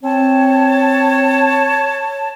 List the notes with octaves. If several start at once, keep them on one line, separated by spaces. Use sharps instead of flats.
C4 C#5 A5